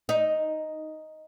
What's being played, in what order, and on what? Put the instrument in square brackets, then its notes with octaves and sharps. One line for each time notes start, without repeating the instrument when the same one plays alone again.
[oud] D#4